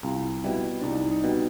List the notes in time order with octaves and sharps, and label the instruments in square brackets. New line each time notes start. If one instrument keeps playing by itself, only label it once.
[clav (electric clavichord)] C2 [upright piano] F4
[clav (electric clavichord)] B2 G3 [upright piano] E4
[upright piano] D4
[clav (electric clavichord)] C2 [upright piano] D#4
[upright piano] D#4
[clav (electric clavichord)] B2 G3